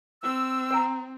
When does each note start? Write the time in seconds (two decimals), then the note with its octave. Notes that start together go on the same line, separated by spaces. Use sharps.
0.23 C4 E6
0.71 C5 G5 A#5